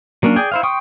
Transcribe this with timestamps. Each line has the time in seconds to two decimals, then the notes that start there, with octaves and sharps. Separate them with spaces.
0.23 F#3 A#3 C#4 D4
0.36 G#4 D5 G5 G#5
0.52 E4 C5 F5
0.63 G5 C6 C#6 D#6